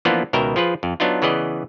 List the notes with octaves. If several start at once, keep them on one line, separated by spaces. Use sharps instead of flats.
E3 F3 A#3 B3 D4 F4
C#2 B2 D#3 A#4 E5 G5
F3 F4 G#4 B4
F2
F#3 B3 D4 D#4 F4
C#3 E3 B3 G#4 D5 D#5